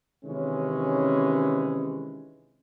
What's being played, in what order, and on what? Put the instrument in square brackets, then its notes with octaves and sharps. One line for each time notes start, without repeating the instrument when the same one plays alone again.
[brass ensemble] C3 D#3 E3 G#3 C#4